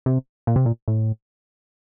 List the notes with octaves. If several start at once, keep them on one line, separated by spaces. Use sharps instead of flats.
C3
A#2
C3
A#2
A2